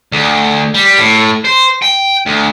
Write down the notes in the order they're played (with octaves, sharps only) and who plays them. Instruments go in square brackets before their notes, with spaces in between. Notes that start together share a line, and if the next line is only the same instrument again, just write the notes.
[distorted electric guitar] D2
G3
A2
C5
G5
D2